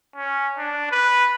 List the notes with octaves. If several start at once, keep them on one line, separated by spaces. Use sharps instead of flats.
C#4
D4
B4